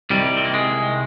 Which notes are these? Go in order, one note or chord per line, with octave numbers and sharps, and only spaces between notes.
C2 C3 D#3 G3
C4
A#3
G#3